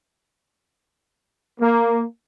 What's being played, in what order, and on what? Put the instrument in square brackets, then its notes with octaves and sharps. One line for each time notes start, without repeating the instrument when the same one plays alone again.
[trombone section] A#3